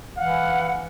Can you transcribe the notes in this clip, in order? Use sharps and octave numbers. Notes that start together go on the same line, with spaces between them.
E3 F5 F#5